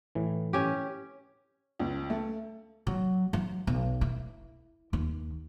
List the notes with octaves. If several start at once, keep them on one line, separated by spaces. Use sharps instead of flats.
A2 E3
C#4 G4
C#2
A3
F#3
F#3
B1
E4
D#2